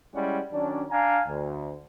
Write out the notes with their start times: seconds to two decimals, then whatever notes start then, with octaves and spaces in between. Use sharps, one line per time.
0.15 G3 G#3 C#4 E4 D5 F#5
0.52 D#3 F#3 C#4 D4
0.90 D4 F5 G#5 A#5
1.27 D2